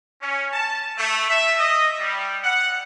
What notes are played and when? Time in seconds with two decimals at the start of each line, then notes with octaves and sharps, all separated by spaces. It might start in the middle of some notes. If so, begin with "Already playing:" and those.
0.22 C#4
0.53 A5
0.96 A3
1.29 E5
1.58 D#5
1.99 G3
2.44 F#5